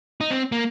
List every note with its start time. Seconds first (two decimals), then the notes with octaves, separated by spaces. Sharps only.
0.21 D#4
0.31 C4
0.52 A#3